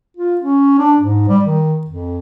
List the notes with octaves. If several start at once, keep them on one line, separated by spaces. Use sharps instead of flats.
F4
C#4
D4
G#2
G3
D#3
F2